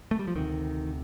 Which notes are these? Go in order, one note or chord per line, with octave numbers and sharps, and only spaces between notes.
A3
G3
F3
D2 C3 D#3